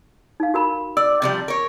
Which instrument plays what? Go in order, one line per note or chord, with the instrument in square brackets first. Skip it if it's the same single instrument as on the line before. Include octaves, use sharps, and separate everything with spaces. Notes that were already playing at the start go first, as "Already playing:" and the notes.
[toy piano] D#4 F5
F#4 A#4 B5
[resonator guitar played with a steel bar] D5 [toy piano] E6
[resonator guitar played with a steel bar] C3 F3 G3
A#4 C#5